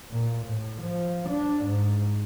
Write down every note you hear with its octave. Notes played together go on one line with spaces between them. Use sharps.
A#2
A2
F3
D4
G#2